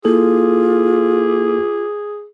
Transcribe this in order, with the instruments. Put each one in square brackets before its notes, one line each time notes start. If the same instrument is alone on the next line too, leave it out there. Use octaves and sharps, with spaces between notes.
[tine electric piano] A#3 E4 A4 [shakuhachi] F4 [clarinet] G#4